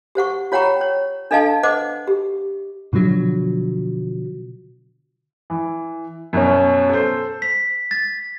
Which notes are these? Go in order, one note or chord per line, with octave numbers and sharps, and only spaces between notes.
G4 C5 F#5 C#6
F4 C#5 F#5 G5 A#5 C#6
C#5
D4 A4 D#5 F5 A5
B4 C5 D#5 F#5 D6
G4
B2 D3 F3 F#3
E3
F#2 B2 C#4
A4 C5
B6
A6